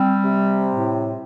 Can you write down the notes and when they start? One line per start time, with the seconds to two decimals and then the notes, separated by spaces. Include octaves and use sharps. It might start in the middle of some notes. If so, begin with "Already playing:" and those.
Already playing: G3 C4
0.24 C3
0.69 A2